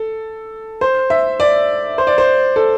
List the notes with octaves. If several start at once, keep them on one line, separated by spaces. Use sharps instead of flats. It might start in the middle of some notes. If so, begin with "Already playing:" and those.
Already playing: A4
C5
E5
D5
C5
D5
C5
A4